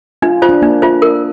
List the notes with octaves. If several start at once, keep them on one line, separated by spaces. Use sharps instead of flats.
D4 F4
F4 C5
D4
A#3 D4
F4 C5
A#4